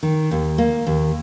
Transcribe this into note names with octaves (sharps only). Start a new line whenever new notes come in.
D#3
D#2
A#3
D#2